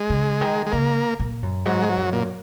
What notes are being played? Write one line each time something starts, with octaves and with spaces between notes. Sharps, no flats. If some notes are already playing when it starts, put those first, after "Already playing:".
Already playing: G#3
C#3
D#3
G#3
C#3 A#3
A#2
F#2
G#2 F#3
G#3
F#3
F#2
A#2